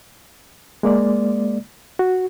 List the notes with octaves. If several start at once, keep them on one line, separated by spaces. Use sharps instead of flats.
G#3 A#3 D5
F#4